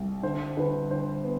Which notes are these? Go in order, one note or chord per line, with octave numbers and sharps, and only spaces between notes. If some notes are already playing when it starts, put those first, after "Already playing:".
Already playing: C2
D3 C5
D3 B4
D3 C5
B3